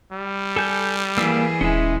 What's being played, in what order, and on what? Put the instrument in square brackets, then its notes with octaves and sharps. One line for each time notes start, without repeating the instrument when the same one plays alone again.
[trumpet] G3
[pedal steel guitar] A4 G#5 G6
[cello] E3 G#4 [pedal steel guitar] A#3 E6
[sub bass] D#1 [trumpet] G#3 [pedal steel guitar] C#4 E4